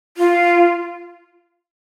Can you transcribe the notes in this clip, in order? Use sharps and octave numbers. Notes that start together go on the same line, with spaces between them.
F4